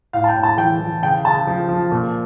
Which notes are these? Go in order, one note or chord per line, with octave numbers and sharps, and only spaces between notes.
A2 F5
A5
G5
A2
A5
E3 G5
E3
C#3 G5
C#3 A5
F3
F3
A#2